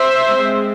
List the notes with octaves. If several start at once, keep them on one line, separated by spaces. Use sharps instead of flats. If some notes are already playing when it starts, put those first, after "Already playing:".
Already playing: C5 E5
G#3 C4